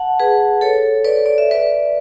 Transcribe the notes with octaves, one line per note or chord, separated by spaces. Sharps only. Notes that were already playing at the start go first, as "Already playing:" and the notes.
Already playing: F#5 A5
G#4 B4
A4 C#5
B4 D5
D5
E5
B4 D5